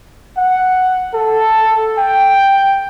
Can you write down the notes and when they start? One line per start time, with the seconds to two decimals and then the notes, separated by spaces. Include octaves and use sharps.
0.37 F#5
1.14 A4
1.98 G5